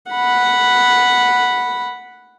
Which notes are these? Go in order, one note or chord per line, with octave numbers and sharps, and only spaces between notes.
F#5 B5